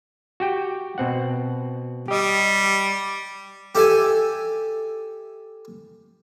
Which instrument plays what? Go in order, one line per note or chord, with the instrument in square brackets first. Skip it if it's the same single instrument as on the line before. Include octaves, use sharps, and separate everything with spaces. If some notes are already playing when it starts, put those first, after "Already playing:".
[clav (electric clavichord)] F#4 G4 G5
B2 C4 F#5
[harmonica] G3 [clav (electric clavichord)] G4 D#5
[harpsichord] G4 A4 E5 G#5